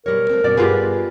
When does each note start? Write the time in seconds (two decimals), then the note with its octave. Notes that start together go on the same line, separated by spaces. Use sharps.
0.06 B2 G3 A#4 C#5
0.30 A3 C4
0.44 G2 B2 C#4 D5
0.57 G2 B3 F4 G4 G#4 B4